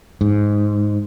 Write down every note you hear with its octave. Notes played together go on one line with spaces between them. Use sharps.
G#2